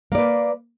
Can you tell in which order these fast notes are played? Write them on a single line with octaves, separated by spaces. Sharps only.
A#3 D5 B4